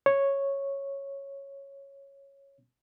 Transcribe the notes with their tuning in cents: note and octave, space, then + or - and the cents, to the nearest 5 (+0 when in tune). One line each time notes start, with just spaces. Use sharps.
C#5 -5